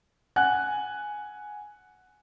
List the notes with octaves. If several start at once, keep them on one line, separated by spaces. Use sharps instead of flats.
F#5 G#5 F#6